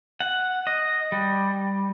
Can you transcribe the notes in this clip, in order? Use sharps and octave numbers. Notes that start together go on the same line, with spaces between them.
F#5
D#5
G3